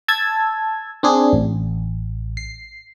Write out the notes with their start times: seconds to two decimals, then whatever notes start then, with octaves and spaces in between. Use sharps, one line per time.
0.08 A5 E6 G#6
1.03 C4 D4 G#4
1.33 A1
2.37 C7